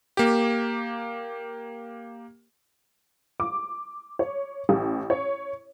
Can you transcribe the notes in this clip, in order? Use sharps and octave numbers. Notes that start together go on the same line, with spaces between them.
A#3 G4
D6
C#5
A1
C#5